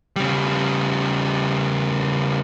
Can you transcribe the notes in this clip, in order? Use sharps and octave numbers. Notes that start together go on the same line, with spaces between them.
C#3 G3